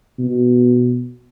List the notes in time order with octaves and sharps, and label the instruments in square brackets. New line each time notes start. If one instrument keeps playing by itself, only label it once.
[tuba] B2